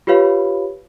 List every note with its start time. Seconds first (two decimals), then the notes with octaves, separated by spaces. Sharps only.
0.07 F4 G4 B4 C#5 F5 B5